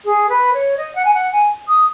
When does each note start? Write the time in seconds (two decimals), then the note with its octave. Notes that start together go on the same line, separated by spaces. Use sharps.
0.05 G#4
0.29 B4
0.53 C#5
0.77 D#5
0.95 F#5
1.05 G#5
1.14 F#5
1.32 G#5
1.68 D#6